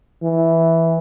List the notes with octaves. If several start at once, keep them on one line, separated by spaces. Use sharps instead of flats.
E3